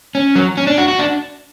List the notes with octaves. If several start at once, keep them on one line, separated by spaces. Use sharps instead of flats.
C#4
F#3
C#4
D4
F#4
F#4
D4